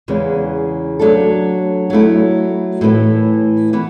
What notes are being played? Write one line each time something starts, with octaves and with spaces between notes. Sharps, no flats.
E2 C#3 E3 G#3
F#3 A3 D4 A4
F#3 A3 E4
A2 E3 A3 E4 B4
E3 B3